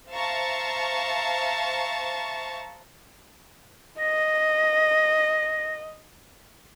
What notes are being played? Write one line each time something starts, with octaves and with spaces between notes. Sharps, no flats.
C5 E5 F5 A5 A#5 C#6
D#5 A#6